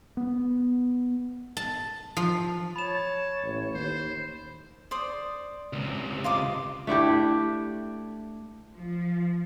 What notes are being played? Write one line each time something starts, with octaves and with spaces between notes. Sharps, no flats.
B3
A5
F3
C#5 A5 B5 E7
A1
D#2 C5
C5 D5 D#6
C#2 C3
F4 D#5 D6
A3 D4 E4 G4
F3